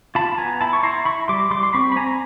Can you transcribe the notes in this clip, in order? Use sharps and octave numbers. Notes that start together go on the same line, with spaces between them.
F4 A5 B5
B3 G#5 A#5
E4 A5 B5
C#6
E4 A#5 C6
E4 B5 C#6
G3 C6 D6
G3 C6 D6
C6
C4 B5 C#6
B5
C4 G#5 A#5